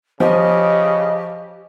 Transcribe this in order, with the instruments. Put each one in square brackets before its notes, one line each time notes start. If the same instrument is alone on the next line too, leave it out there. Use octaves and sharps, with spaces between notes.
[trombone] C#3 [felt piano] F3 [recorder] G4 [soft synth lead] D#5